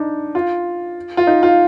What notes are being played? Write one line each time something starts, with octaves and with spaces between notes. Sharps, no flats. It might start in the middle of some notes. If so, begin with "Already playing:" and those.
Already playing: D4 D#4
F4
F4
D#4
F4